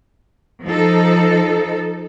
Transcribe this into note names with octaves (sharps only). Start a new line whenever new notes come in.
F3 D#4 A4